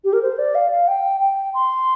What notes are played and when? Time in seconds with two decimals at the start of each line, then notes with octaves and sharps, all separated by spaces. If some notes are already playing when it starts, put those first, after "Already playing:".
0.04 G4
0.13 A#4
0.22 C5
0.38 D5
0.55 F5
0.71 F5
0.88 G5
1.20 G5
1.54 C6